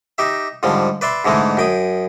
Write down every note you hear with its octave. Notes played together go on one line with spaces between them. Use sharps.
D#4 G4 E5
G#2 D3 F3 G3
B4 D5 E5 C6
G#2 D3 E3 G#3 A3
F#2 G5 D#6